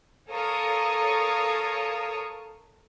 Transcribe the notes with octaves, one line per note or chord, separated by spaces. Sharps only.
A4 A#4 C#5 F5 C#6 D#6